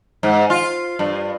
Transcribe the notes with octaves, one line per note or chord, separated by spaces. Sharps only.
G#2
F4
G2